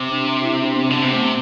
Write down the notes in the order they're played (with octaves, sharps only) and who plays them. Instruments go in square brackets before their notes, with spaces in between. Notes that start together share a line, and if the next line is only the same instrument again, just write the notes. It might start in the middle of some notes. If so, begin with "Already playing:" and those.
Already playing: [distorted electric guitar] C3
[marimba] D4
E4
D4
B3
C4
[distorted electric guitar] D3
[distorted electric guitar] C3 [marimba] B3
[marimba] A3
B3